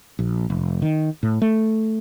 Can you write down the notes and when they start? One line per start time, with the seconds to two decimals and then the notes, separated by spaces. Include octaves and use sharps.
0.19 A#1
0.50 F1
0.82 D#3
1.23 A2
1.42 A3